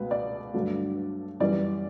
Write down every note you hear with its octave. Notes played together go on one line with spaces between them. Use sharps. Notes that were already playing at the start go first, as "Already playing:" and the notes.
Already playing: C#2 B2 A3 B4
D5
G2 D3 F#3 A3
F#2 E3 G3 D5